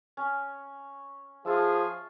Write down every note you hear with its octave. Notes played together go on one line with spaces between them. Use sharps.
C#4
F3 F4 G#4 E5